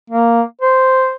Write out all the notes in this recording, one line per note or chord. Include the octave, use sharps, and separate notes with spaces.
A#3
C5